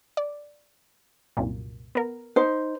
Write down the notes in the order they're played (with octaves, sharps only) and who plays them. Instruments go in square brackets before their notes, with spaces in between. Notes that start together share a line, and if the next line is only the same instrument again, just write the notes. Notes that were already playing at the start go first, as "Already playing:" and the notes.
[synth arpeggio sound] D5
C2 F#2 A#2
B3 A#4
[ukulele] D#4 C5